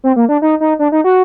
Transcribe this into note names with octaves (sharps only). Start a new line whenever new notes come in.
C4
A#3
D4
D#4
D#4
D4
D#4
F#4